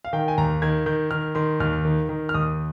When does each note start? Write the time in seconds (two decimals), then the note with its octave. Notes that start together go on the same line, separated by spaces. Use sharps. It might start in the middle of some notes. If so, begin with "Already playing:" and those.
0.05 F5
0.13 D#3 G5
0.28 G#5
0.38 D#2 A#5
0.62 D#3 G#6
0.86 D#3 G6
1.11 D#3 F6
1.35 D#3 C6
1.60 D#2 F6
1.85 D#3
2.09 D#3
2.29 F6
2.34 D#2 D#6